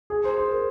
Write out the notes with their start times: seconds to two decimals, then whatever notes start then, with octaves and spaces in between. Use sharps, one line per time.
0.10 G#4
0.24 C5
0.38 C5
0.51 A#4